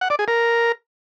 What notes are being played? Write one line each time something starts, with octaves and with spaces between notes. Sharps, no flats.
F#5
D5
G#4
A#4